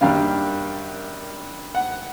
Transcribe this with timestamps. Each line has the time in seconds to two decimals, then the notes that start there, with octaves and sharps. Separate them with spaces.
0.01 F#2 D#3 G3 A#3 D4 F5
1.75 F#5